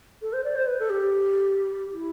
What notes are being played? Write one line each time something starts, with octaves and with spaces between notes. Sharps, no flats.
A4
C5
D5
C5
B4
A4
G4
E4